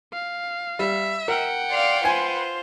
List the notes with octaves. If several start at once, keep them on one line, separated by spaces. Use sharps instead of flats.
F5
G3 E5
A#4 F#5 G5
D5 F5 C6
F4 B4 C5 G#5